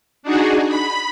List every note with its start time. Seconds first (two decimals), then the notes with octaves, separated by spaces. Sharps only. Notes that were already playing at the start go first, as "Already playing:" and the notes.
0.23 D4 D#4 F#4 G#4
0.68 B5